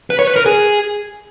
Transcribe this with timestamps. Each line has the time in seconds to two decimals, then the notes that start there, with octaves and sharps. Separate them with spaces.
0.10 B4
0.19 C#5
0.27 B4
0.36 A#4
0.46 G#4